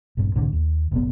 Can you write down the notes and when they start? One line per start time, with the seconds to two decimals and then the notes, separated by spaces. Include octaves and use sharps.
0.17 A#1 G2
0.35 C2 A2 D3 D#3
0.53 D#2
0.91 F1 A#1 B3